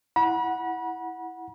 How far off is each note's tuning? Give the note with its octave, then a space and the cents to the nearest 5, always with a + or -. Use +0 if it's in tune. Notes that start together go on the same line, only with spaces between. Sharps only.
E4 +0 F#5 -5 B5 -40